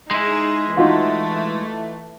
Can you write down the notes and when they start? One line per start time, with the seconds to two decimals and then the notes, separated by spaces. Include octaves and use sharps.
0.11 G#3 D#4 E4 G#4
0.77 E3 A3 D#4 F4 F#4